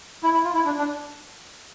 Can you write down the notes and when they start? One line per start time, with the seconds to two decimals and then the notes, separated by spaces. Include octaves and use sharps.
0.23 E4
0.34 E4
0.44 F4
0.54 E4
0.65 D4
0.78 D4